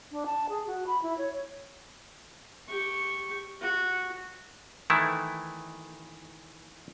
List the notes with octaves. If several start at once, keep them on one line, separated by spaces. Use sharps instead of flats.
D4
A5
G#4
F#4
B5
E4
C#5
G4 C#6
F#4
D#3 E3 A3 E4